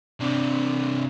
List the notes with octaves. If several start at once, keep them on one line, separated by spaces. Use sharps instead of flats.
C3 D4